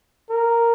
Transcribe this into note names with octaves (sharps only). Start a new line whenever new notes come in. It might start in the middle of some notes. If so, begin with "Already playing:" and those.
A#4